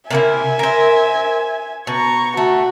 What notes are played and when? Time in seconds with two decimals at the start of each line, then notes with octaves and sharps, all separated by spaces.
0.10 C3 A#3 E4 E5 G#5
0.59 A#4 C5
1.87 B2 A#5 C#6
2.37 A3 F#4